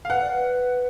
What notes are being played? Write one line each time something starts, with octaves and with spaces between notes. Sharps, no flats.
F5
B4 F#5
D5
B4